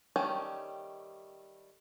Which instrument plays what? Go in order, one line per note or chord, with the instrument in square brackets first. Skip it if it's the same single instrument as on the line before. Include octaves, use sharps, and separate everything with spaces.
[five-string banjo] D#3 G3 A3 C#4